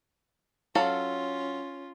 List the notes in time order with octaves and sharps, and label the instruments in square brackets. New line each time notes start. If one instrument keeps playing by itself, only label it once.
[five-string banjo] F#3 A4 F5 [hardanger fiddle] C#4 F4